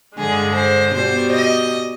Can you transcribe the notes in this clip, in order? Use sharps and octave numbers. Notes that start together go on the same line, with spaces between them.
G2 D3 G#3 G#4
C5
B2 G3 C5
D#5